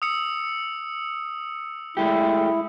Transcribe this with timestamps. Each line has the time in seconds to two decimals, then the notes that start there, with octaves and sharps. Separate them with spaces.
0.02 D#6 E6 C#7
1.97 G#3 A3 E4 G4